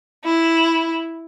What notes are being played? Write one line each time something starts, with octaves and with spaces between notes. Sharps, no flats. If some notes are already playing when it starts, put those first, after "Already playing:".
E4